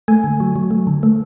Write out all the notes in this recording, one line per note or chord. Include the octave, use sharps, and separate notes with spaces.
A3 G#5
D3
F#3
F#3
A3
D3
A3